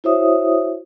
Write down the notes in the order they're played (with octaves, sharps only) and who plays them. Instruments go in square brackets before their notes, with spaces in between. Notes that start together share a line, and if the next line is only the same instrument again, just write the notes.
[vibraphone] E4 F#4 C5 C#5 E5 D#6